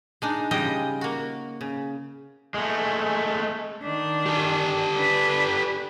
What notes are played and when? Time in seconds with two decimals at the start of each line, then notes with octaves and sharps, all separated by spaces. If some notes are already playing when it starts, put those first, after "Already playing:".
0.22 G#3 D4 D#4
0.51 C#3 G3 G#3 F4 D#5 G5
1.01 A#3 F#4
1.61 C#3
2.54 G#3 A3
3.83 D#3 D4
4.26 G4 A4
4.95 D4 B4